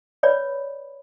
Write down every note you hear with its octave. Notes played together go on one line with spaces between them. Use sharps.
B4 C#5 D5 B5